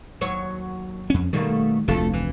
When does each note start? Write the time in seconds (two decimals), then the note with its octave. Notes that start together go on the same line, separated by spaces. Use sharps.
0.21 D#2 F#3 C#5
1.10 F2 C#4
1.33 B2 D#3 G3 A3 A#3
1.88 F1 D2 A3 F4 A4
2.13 E3